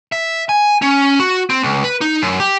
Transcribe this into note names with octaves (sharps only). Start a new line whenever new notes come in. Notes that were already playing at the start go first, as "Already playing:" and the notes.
E5
G#5
C#4
F#4
C4
C#2
B4
D#4
F#2
G4